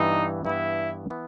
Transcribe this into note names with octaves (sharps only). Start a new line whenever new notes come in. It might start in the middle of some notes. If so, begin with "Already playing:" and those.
Already playing: G2 E3 B3 D#4
G2 E3 B3 E4
E3 B3